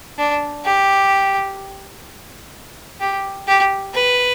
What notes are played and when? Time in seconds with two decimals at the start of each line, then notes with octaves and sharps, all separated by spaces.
0.18 D4
0.65 G4
3.00 G4
3.47 G4
3.94 B4